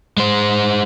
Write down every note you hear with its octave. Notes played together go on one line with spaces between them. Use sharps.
G#3 C5